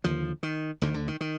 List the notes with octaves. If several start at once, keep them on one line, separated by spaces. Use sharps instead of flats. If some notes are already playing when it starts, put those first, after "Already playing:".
D#2 D3 F3
D#3
D2 D3 D#3
D3
D#3
D#3